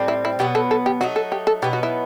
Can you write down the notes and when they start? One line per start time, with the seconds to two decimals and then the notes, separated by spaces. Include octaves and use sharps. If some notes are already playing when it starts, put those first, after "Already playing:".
Already playing: A2 G3 C4
0.08 E4
0.25 E4
0.39 B2 F#3 B3 G4
0.55 A4
0.71 A4
0.86 G4
1.01 F#3 A3 D#4 F#4
1.16 A4
1.32 G4
1.47 A4
1.62 B2 F#3 B3 D#4 G4
1.73 F#4
1.83 E4